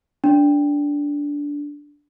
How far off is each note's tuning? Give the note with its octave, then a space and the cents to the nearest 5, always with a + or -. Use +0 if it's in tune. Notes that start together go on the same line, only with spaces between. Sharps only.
D4 -15